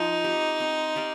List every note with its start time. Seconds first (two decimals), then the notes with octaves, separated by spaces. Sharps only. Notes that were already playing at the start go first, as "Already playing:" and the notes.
Already playing: F3 D#4
0.24 C4 G4
0.60 C4
0.96 G4 D5 F5